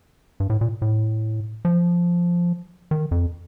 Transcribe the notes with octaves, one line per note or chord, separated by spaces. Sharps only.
G2
A2
A#2
A2
F3
D#3
F2